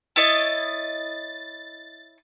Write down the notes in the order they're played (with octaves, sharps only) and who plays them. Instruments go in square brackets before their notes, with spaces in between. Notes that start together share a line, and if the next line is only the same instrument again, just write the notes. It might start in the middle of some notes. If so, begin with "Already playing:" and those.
[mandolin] E4 C#5 D#5 [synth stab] A6